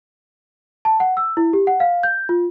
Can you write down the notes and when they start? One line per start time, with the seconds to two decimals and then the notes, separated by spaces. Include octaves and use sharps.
0.85 A5
1.00 F#5
1.17 E6
1.37 E4
1.53 G4
1.67 F#5
1.80 F5
2.03 G6
2.29 F4